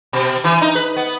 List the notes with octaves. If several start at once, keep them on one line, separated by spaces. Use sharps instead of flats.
B2
E3
D#4
B4
B3